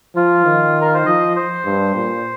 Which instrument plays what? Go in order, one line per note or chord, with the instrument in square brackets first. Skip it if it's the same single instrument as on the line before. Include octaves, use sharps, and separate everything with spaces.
[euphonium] F3 [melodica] F4
[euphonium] D#3
[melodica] A#4
C5
[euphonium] F3 [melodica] D#5
[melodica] C5
[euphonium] G2
A#2